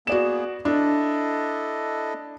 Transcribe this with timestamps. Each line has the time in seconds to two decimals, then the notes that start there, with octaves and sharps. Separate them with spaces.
0.07 A#3 B3 F#4 G#4 D5 E7
0.65 D4 E4 A4 D#5